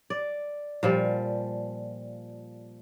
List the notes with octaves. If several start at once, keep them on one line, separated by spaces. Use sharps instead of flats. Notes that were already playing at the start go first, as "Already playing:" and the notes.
D5
A#2 F3 G3